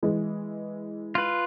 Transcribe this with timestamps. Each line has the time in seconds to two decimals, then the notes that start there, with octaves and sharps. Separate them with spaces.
0.03 E3 G#3
1.15 F4 B4